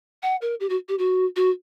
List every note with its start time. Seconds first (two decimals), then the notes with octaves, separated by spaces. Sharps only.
0.23 F#5
0.42 A#4
0.60 G4
0.69 F#4
0.88 G4
0.99 F#4
1.36 F#4